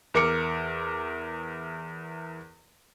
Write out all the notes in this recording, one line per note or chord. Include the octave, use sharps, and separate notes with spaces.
E2 A#4 D6 C#7